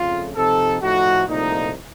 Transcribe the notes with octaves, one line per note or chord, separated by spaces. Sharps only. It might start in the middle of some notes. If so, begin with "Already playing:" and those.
Already playing: F2 C#3 A3 F4
C3 F3 C4 D#4 A4
A2 F3 A3 D#4 F#4
C2 A#2 F3 A3 D#4